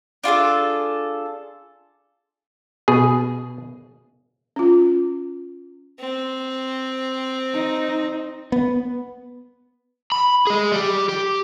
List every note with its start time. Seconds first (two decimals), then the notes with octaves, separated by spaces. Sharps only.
0.24 D4 F4 G#4 A4
2.88 B2 G#4
4.56 C#4 F4
5.99 C4
7.54 D#4
8.52 B3
10.12 B5
10.47 G#4 D#5
10.72 G3 G4
11.09 G4